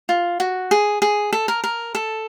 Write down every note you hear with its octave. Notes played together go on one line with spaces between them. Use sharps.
F4
F#4
G#4
G#4
A4
A#4
A#4
A4